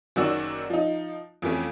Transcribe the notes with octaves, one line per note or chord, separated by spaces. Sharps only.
F#1 D#3 F#3 F#4 D5 E6
F3 D#4
F2 E3 F3 A3 C#4